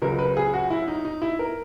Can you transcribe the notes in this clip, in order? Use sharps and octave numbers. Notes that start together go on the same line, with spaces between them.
C#2 C#3 F#3 A#4
B4
G#4
F#4
E4
D#4
D#4
E4
A#4